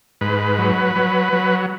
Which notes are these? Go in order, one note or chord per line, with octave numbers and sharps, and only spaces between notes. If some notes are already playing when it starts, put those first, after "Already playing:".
G#2 B4
F#3
F#3
F#3